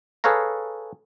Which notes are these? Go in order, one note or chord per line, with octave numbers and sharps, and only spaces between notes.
G#4 A4 B4 C#5 F5 A#5